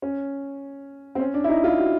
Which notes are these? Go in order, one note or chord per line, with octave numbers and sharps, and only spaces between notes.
C#4
C4
C#4
D4
E4
D#4
F4
F#4